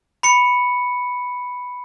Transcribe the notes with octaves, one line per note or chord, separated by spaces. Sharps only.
B5 C#7